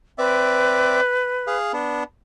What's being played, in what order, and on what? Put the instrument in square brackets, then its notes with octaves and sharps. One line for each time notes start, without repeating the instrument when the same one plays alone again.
[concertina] C4 D5 E5 [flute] B4
[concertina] G#4 F5
B3 D4